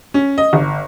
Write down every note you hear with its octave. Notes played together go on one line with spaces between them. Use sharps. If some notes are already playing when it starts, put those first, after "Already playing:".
C#4
D#5
G1